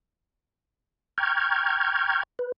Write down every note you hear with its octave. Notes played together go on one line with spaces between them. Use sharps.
G5 A#5 C#6 F6 G6 G#6
B4